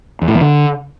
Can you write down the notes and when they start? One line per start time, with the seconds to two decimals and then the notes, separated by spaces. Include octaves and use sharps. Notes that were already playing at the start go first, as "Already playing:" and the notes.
0.22 E2
0.28 A2
0.35 E2
0.41 D3